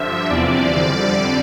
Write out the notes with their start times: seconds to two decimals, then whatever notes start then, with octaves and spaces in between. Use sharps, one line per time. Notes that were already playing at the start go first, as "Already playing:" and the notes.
Already playing: G2 D3 F3 E5
0.29 E2 C3 F3 D5
0.73 F2 D3 G3